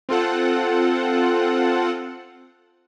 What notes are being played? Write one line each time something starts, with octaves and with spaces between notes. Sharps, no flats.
C4 F4 A4 F#5